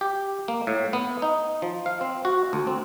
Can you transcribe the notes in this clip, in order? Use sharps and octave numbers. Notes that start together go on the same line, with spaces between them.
G4
A#3
A2
B3
D#4
F3
F5
C4
F#4
D2
C4